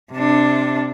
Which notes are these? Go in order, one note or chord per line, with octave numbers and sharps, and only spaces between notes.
C3 D4